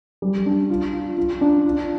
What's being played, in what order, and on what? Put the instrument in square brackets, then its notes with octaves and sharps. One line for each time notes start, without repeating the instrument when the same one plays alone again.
[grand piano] G3
D4
F4
F4
F4
D4
F4